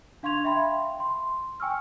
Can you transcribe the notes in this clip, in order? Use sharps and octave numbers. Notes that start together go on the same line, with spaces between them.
D4 F5 C6 C#6 G#6 F7
E5 F5 G5 B5 C6
C6
G5 G#5 C#6 E6 F6